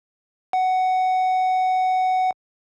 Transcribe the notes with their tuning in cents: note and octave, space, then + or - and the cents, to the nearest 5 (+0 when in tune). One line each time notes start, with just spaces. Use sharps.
F#5 +10